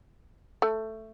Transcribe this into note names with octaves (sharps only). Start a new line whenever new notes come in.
A3